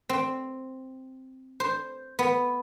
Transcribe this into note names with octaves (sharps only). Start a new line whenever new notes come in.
C4
C5
B3